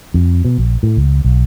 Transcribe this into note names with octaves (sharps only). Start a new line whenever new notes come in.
F2
B2
A#1
A2
C#2
B1